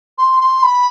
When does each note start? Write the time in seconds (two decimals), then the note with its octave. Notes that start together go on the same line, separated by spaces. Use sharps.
0.18 C6
0.40 C6
0.62 B5